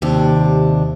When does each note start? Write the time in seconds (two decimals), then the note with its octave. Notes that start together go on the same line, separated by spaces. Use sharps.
0.02 D#2 C3 D4